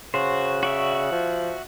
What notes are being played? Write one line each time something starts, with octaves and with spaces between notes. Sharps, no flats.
C#3 F#4 C5
F#4 D5 E5
F3